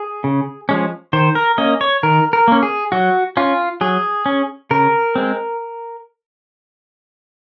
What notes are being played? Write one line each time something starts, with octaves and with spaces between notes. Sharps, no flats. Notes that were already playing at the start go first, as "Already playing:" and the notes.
Already playing: G#4
C#3
F3 G#3 C#4
D#3 C5
A#4
A#3 C#4 D#5
C#5
D#3 A#4
A#4
A#3 C#4
G#4
F#3 F#4
C#4 F4
F#3 G#4
C#4
C#3 A#4
G#3 C4